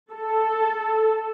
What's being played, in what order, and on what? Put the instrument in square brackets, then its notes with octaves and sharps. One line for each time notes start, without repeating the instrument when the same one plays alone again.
[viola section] A4